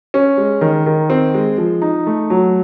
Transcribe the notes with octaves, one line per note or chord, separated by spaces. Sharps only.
C#4
G#3
D#3
D#3
C4
G#3
F3
D#4
A3
F#3